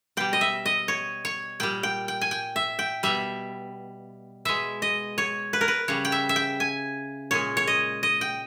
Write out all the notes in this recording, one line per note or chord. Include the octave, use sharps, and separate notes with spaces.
B2 G3 G5
D#5
E5
D#5
C#5
C#5
A#2 G3 G5
G5
G5
G#5
G5
E5
G5
B2 G3 E5
B2 G#3 E5
D#5
C#5
B4
A#4
B4
C#3 G3 C#5
G5
E5
E5
G5
G#5
A#2 G#3 C#5
C#5
D#5
D#5
G5